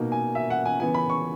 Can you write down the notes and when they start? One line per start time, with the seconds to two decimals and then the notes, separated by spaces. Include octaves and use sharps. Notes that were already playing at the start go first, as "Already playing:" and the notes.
Already playing: B2 A#3 D#4
0.12 G#5
0.35 E5
0.50 F#5
0.66 G#5
0.79 C#3 E3 B3 G#5
0.94 B5
1.09 C#6